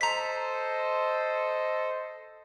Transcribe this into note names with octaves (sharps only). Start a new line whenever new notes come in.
A4 C5 D#5 A#5 B6